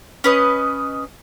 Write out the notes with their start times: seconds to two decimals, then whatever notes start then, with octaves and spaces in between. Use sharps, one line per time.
0.24 C#4 B4 D#5